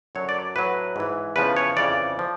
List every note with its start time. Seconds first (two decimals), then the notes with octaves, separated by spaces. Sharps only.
0.15 F#2 D3 F#3 C#5
0.29 D5
0.55 A2 F#3 B4
0.96 G#2 E3
1.36 E2 C#3 F3 B4
1.57 C#5
1.77 F2 C#3 E3 D5
2.19 F3